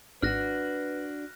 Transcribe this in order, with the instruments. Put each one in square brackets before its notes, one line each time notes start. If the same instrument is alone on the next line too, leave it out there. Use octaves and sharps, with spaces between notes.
[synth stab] G#1 [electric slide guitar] D4 F#4 [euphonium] B4 [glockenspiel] F6 F#6 A#6